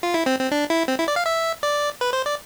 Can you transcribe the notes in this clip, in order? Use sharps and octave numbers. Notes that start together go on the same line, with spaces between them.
F4
E4
C4
C4
D4
E4
C4
E4
D5
F5
E5
D5
B4
C5
D5